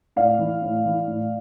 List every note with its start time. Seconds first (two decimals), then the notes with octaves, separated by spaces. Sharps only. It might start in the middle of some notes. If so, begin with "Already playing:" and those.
0.16 A2 D5 F5
0.39 E3
0.62 A2
0.86 E3
1.08 A2